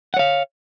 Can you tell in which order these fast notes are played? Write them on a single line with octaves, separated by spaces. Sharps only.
F#5 C#5 F5